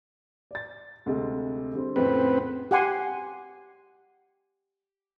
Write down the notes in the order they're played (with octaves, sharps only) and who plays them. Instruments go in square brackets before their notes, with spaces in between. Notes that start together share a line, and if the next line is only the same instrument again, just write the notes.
[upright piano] D5 A6
D2 C3 G#3
D3 G3 C4
[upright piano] F2 A2 C#3 [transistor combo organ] C4 B4
[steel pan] G4 F#5 G#5 C6